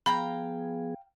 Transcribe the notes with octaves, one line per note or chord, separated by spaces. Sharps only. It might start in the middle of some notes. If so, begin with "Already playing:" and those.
F3 B3 G#4 F5 G5 A#5 B5